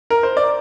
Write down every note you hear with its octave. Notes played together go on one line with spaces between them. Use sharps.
A#4
C5
D5